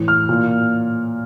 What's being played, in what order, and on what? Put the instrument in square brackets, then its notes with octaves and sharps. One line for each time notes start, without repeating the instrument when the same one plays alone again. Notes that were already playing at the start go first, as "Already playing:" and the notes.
Already playing: [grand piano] A2 E3
F6
A#2